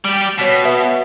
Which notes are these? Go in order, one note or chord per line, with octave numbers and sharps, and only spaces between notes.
G3 G4 D7
B2 C#5 B6
B4 E5 F#5